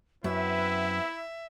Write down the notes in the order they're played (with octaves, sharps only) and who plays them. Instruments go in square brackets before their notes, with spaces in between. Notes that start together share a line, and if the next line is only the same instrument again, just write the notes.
[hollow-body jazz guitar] F#2 [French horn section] B3 C4 B4 [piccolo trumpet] E4 [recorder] E5